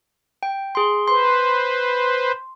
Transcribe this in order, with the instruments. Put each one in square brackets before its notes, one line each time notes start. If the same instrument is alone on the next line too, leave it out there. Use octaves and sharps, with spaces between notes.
[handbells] G5
G#4 C6
[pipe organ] B4 C5 [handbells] C6